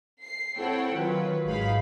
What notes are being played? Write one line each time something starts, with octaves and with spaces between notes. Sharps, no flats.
C7
C4 E4 A4 C#5 F#5 G5
D#3 F#3 F4 B4
G#1 F#3 G#3 D#4 F5 B5